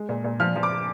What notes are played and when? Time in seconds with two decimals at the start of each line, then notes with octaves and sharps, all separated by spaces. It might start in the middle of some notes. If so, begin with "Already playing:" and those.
Already playing: G#3
0.09 A#2
0.24 A#2
0.40 F3 F6
0.56 F3
0.63 D6